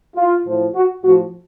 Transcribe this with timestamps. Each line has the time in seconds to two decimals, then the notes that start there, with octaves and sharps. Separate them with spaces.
0.16 F4
0.45 A2 F3
0.75 F#4
1.03 A2 F3 F#4